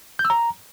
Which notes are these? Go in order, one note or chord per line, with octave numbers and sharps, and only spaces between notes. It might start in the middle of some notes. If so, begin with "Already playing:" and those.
G6
E6
A#5